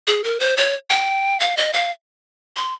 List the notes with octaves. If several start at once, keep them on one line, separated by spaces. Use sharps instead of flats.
G#4
A#4
C5
C#5
G5
F5
D#5
F5
C6